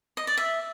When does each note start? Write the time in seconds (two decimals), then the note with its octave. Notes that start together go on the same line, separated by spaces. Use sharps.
0.17 D#5
0.27 D5
0.38 E5